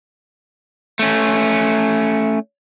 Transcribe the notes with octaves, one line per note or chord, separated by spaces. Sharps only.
A3 C#4